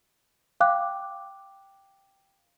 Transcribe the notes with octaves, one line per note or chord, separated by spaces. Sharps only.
F5 G5 D6 F#6